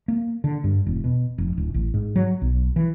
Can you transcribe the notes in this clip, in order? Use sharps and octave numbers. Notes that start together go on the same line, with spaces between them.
A#3
D3
G2
E1
B2
F1
D1
A1
G#2
F#3
B1
E3